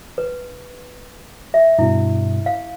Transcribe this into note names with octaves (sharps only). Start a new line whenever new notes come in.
B4
E5
G2 B2 E4
F5